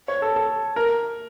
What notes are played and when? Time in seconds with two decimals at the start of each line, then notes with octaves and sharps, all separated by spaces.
0.08 C#5
0.22 A4
0.36 A4
0.76 A#4